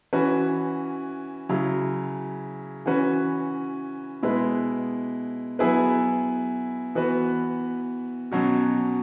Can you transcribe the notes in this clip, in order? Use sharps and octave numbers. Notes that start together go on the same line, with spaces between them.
E3 C#4 F#4 B4
C#3 F#3 E4
E3 C#4 F#4 B4
B2 G#3 E4 B4
F#3 B3 E4 G#4 B4
E3 B3 F#4 B4
B2 F#3 C#4 F#4